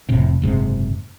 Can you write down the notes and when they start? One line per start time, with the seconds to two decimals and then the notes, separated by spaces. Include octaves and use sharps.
0.09 F1 A2 C3
0.42 F#1 G#2 C3